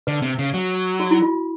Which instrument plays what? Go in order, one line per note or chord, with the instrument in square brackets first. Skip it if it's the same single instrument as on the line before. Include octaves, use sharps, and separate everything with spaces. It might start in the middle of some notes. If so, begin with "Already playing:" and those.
[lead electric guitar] D3 [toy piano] B4
[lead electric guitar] C3
C#3
F#3
[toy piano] F#4
E4
F4